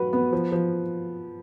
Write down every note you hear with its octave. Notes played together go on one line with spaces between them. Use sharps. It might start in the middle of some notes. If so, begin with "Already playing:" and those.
Already playing: F#3 F#4 B4
B3
F3
F3